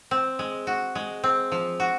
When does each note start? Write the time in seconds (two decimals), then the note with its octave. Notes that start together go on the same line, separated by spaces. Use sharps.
0.11 C4
0.39 G#3
0.67 F#4
0.95 G#3
1.24 C4
1.52 F3
1.80 F#4